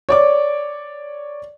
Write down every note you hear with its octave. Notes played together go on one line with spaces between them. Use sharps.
C#5 D5 D6